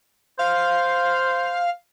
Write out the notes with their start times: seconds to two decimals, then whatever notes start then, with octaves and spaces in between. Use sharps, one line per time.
0.39 C5 F5